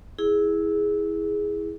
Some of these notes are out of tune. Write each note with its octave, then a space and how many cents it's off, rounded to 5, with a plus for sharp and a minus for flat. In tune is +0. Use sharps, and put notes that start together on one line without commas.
E4 -15 G#4 +0